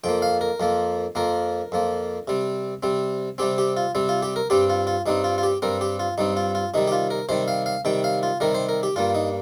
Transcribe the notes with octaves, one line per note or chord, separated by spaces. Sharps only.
F2 F3 A#3 G5
F5
A#4
F2 F3 A#3
F2 F3 A#3 A#4
F2 F3 A#3
C3 G3 C4
C3 G3 C4
C3 G3 C4 G4
G4
F4
C3 G3 C4
F4
G4
A#4
G2 G3 C4 G4
F4
F4
G2 G3 C4 D#4
F4
F4
G4
G2 G3 C4 A#4
G4
F4
G2 G3 C4 D#4
F4
F4
C3 D#3 G3 D#4
G4
F4
A#4
C3 D#3 G3 C5
F5
F5
C3 D#3 G3 G5
F5
F4
C3 D#3 G3 A#4
C5
A#4
G4
G2 G3 A#3 F4
D#4